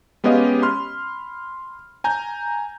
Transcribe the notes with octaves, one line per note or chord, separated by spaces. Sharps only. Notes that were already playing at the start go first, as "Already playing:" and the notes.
G#3 B3 C#4 G4 D#5 F5
B5 C6 F6
G#5 A#5 G6